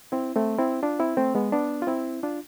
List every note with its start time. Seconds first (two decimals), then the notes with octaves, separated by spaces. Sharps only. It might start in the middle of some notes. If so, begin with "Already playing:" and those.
0.12 C4 E4
0.36 A3 C4
0.59 C4 E4
0.83 D4 F4
0.99 C4 E4
1.17 A3 C4
1.35 G#3 B3
1.52 B3 D4
1.82 F4
1.87 C4 E4
2.23 D4 F4